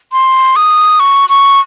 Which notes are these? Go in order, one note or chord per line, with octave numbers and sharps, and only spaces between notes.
C6
D#6
C#6
C#6